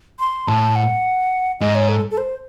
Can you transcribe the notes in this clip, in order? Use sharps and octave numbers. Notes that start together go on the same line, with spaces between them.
C6
A2 A5
F#5
G#2 D#5
C#5
A4
A4
C5